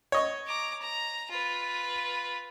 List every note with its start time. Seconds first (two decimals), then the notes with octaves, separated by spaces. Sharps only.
0.12 C#5 D#5 C#6
0.47 A#5 D6
0.81 A#5
1.31 F4 B4